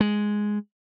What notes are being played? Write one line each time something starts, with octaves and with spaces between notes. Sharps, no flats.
G#3